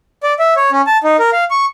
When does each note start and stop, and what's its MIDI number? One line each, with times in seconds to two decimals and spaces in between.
0.23 0.33 74
0.39 0.54 76
0.56 0.70 73
0.72 0.81 61
0.87 0.97 81
1.04 1.17 63
1.19 1.30 70
1.33 1.44 77
1.51 1.65 85